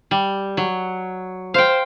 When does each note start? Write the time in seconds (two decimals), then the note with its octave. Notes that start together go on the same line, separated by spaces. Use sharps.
0.11 G3
0.57 F#3
1.54 C5 F5 G5